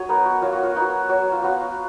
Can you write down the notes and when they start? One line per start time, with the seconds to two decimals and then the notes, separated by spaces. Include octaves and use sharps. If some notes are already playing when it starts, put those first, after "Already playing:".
Already playing: F#3 C#5 D#5
0.09 B3 D#4 A#4
0.26 F#4
0.42 F#3 F4
0.52 F#4
0.63 F4
0.76 B3 D#4 F#4
1.09 F#3
1.32 F4
1.43 B3 F4 F#4